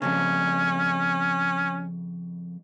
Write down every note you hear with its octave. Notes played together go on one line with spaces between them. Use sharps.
F2 A2 C#3 C#4